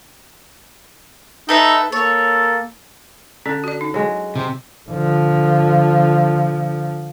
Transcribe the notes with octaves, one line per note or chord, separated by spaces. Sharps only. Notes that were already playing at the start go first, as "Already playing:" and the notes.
D#4 A4 B4 E5
A#3 A4 C#5
D3 C#4
F#4 D5
D#4
F#3 G#3
C3
D3 F3